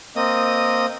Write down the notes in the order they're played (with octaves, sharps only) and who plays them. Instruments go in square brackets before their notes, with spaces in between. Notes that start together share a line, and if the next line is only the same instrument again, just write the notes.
[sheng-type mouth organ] A#3 C4 D#5 D#6